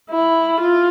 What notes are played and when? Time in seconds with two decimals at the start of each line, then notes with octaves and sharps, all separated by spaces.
0.10 E4
0.60 F4